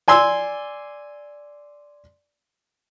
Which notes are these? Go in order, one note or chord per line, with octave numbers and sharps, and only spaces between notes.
D5 G#5 C6 E6